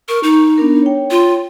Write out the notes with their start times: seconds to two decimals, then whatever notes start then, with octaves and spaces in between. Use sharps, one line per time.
0.08 A#4 C#6
0.23 D#4
0.58 B3 D4 A#4
0.82 C#5 G5
1.11 F4